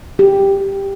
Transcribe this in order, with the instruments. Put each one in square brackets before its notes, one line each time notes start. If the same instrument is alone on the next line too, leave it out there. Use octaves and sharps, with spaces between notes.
[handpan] G4